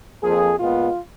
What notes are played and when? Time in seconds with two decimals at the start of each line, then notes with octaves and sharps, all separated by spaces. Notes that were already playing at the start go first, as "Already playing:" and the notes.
0.22 F2 F3 A#3 G#4
0.59 A#2 G#3 B3 F4